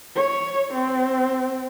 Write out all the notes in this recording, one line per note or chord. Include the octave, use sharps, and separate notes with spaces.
C#5
C4